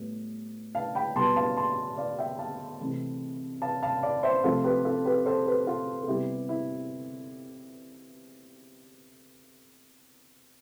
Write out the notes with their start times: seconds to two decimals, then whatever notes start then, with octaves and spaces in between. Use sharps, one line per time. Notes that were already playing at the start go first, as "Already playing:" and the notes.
Already playing: A2 G3 B3
0.75 F5 A5
0.95 G5 B5
1.16 B2 G3 B3 A5 C6
1.36 F5 A5
1.57 A5 C6
1.97 D5 F5
2.18 E5 G5
2.39 F5 A5
2.80 C3 E3 A3
3.62 F5 A5
3.83 F5 A5
4.03 D5 F5
4.23 C5 E5
4.44 C3 F3 A3 F4 A4
4.64 G4 B4
4.85 F4 A4
5.05 G4 B4
5.26 A4 C5
5.46 G4 B4
5.66 F4 A4
6.03 A4
6.08 C3 G3 B3 E4 G4
6.49 E4